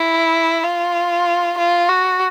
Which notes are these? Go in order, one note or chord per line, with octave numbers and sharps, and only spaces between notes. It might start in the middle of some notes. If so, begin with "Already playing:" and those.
Already playing: E4
F4
F4
F#4